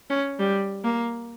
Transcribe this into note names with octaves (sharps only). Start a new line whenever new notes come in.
C#4
G3
A#3